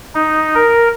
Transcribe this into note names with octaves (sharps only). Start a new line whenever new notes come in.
D#4
A#4